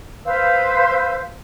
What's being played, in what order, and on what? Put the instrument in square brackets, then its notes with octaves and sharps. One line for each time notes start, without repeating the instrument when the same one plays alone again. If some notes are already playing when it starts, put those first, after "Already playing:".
[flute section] B4 C5 F5 E6